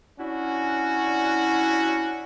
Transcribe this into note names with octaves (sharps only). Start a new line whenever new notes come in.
C#4 D4 E4 F#4